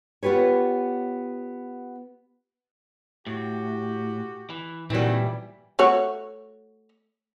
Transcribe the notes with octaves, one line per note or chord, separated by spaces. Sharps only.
B3 F4 G4 B4 C#5
A2 F#4 G4
E3
A#2 D#3 E3 F#3 G3 C4 E4
A3 F#4 C#5